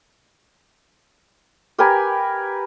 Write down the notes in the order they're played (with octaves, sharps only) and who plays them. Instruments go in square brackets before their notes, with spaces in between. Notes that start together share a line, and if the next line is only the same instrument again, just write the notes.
[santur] G4 A#4 B4 G#5